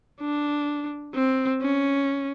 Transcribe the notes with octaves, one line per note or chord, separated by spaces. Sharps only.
D4
C4
C#4